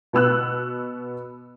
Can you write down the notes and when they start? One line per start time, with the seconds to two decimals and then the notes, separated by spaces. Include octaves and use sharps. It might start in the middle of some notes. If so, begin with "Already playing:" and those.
0.13 B2 B3 E6 F#6